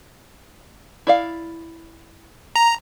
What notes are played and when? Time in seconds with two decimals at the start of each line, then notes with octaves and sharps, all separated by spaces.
1.07 E4 D5 F5
2.56 A#5